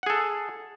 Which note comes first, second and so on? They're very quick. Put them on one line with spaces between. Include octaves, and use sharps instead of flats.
F#5 G#4 A4